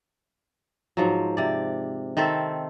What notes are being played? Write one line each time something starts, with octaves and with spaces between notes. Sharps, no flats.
G#2 F3 F#3
C3 D5
D#3 C4 A4 E5